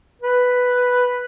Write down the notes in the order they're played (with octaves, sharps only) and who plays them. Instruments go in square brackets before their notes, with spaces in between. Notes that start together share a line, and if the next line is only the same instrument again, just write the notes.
[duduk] B4